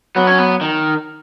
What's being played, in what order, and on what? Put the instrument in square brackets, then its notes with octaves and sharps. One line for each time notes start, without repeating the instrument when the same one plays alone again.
[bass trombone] F#3 [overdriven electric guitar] B3
[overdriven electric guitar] C#4
B3
D#3